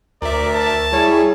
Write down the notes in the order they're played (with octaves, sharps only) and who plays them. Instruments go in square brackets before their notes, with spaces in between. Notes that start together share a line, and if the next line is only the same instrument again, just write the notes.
[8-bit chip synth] D2 E5 [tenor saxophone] A#4 [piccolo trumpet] D5
[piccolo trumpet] A5
[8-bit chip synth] G3 [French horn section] E4 G#4 [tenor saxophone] C#5